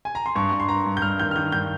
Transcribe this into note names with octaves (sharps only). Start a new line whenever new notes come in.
G#5
A#5
C6
G2 C#6
G2
C6
G2 A#5
G2
G6
G2 F6
D#3 G6
F6
D#3 G6
G2 G6